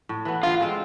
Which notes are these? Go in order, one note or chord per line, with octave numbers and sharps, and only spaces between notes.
A2
E3 B3
D3 F4
G#3 C4 F4